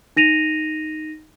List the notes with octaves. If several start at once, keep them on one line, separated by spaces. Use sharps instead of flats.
D#4 A#6 D#7 F7